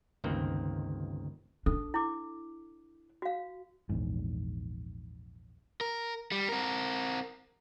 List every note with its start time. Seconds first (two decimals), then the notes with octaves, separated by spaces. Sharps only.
0.24 G1 C#2 D#3 A#3 C4
1.66 D4 A4
1.94 E4 D6
3.22 F#4 F5
3.89 A#1 E2 G#2
5.81 A#4
6.32 G3
6.49 C4 A#4